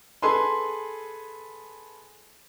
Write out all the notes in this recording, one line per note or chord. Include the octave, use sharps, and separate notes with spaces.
G#4 A4 B4 G#5 C6